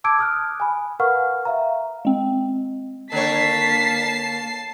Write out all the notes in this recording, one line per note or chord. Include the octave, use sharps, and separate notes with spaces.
A5 D6 E6 G#6 D7
D#6 F6 F#6
G#5 B5
A#4 B4 F5 F#5 C#6 F6
E5 F5 A#5
G#3 C4
D3 A#3 C#5 A5 B6 C7